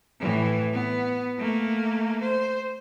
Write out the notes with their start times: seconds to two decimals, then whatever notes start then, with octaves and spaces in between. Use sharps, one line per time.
0.20 A2 E3
0.73 B3
1.38 A3 A#3
2.22 C5